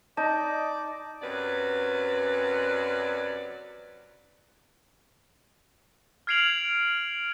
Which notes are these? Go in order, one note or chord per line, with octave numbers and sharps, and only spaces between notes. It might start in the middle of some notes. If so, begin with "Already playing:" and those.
D#4 D5 A5
F#2 C3 F#3 B4 D5
F6 G#6 C7 D7 F7 F#7